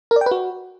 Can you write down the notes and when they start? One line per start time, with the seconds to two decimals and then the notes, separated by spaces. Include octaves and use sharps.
0.11 A#4
0.16 D5
0.21 G5
0.26 B4
0.31 F#4